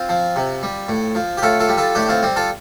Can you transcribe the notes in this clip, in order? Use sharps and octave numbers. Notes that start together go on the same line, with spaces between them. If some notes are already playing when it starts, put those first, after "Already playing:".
Already playing: C4 F4
F3
C3
G3
A2
F3
G4
A2 F4 A4
F4 A4
G3
F4 A4
A2 D4 G4
C4 F4
G3 C4
F4 A4